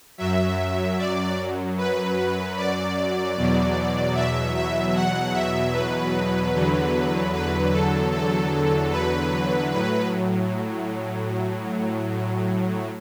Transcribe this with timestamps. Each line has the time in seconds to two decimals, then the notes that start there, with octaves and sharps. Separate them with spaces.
0.18 F#2 F#3 E5
0.98 D5
1.78 B4
2.57 D5
3.37 E2 B2 F#3
4.15 E5
4.55 E5
4.95 F#5
5.34 E5
5.74 B4
6.54 E2 D3 F#3
7.34 B4
7.72 A4
8.12 A4
8.91 B4
9.71 A2 F#3 B4